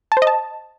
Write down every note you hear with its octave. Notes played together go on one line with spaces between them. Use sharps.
A5
C5
D#5
A5